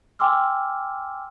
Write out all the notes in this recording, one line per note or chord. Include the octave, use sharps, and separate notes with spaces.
G5 G#5 C6 D6 E6 F6